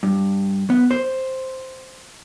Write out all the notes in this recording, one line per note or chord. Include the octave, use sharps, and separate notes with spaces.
G2
B3
C5